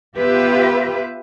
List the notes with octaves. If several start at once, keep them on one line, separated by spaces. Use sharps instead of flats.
B3 F4 G4 B4 E5